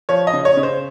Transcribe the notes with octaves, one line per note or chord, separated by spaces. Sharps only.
F3 C#5
D#5
C#3
C#5
C#3
C5